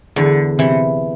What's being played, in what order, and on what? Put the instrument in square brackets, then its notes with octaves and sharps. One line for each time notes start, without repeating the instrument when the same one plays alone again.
[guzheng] E2 [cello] D3
[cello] C3 [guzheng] E3